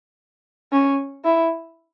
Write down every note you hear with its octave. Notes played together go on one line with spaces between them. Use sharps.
C#4
E4